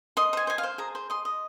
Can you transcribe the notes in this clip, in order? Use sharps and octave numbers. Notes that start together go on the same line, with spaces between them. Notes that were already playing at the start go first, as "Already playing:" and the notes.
D#5 C6
C5 G#5
C5 G#5
F5
C5
G#4 A#5
C5
D#5 C6
D#5